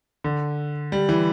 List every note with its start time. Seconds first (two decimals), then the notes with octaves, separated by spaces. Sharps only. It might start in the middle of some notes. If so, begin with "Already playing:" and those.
0.24 D3
0.92 G3
1.09 E3